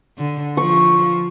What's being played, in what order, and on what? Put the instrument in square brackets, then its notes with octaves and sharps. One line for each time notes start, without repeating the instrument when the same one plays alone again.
[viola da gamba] D3
[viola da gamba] F3 [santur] C#6